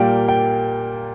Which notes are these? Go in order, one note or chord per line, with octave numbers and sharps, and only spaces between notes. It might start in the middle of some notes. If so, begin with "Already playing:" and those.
Already playing: A#2 G3 A#3 G5
G5